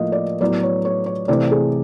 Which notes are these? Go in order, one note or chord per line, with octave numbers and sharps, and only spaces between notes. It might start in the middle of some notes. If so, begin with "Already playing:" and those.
Already playing: A2 F3 A#3 D#5
D5
A2 F#3 B3 D5
C#5
C#5
C#5
C3 E3 A3 D5
G#4